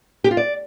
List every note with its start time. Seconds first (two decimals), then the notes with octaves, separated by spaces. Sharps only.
0.24 G4
0.31 F4
0.37 D5